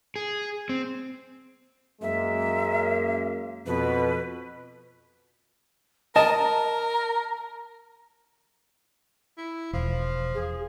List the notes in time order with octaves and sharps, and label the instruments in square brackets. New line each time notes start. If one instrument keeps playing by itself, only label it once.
[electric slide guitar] G#4
C4
[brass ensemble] F#2 G#3 A#3 [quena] E5
[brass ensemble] F2 B2 [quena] B4
[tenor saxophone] A#4 [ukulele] D#5 [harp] A5 [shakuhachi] A#5
[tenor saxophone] E4
[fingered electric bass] E1 [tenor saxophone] F3
[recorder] G#4